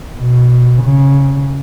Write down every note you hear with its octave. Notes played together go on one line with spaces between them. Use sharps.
B2
C#3